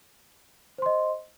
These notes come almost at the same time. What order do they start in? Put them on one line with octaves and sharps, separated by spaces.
C5 C6 D#5